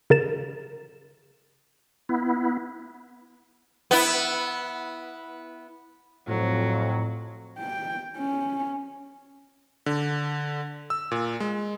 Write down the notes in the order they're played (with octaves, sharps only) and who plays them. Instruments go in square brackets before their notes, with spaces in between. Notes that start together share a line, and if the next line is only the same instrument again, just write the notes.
[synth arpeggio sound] C#3 A#4 A6 E7
[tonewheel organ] B3 E4
[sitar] B3 E4
[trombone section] F2 [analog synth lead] A2 [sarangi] F#3
[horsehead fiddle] G5
C#4
[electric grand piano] D3
E6
A#2
G#3